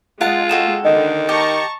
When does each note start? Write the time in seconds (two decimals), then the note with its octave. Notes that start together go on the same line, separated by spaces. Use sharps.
0.21 G#3 F4 F#5 A5
0.49 F#4 A4 G5 E7
0.85 D3 D#3 D#5
1.29 G4 A5 A#5 C#6